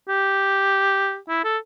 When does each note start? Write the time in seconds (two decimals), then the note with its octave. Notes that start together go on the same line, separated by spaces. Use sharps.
0.08 G4
1.29 E4
1.44 A4